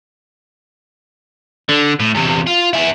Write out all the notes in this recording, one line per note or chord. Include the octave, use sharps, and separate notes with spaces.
D3
A2
E2 C3
F4
E4 G#4